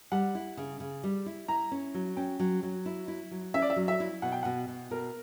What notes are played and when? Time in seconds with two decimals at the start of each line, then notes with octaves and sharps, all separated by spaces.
0.12 G3 F#5
0.35 E4
0.57 C#3
0.80 C#3
1.04 G3
1.26 E4
1.48 E4 A#5
1.72 C#4
1.94 F#3
2.17 C#4 G5
2.40 F#3
2.63 F#3
2.86 E4
3.08 E4
3.31 F#3
3.54 C#4 E5
3.62 D5
3.70 E5
3.76 F#3
3.88 E5
4.00 E4
4.22 B2 F#5
4.32 G5
4.43 B2 F#5
4.68 B2
4.91 B2 A#4